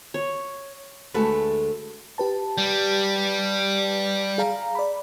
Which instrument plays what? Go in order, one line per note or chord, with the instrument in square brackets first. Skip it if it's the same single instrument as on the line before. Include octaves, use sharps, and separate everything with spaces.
[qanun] C#5
[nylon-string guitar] D2 G#3 A3 F#4 A4 B4
[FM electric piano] G4 B4 A5
[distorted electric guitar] G3
[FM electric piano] G#4 F5 A#5
D5 B5